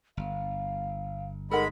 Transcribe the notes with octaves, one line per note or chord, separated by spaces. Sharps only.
G1 F5
G#3 D#4 A4 A#4 F#5 B5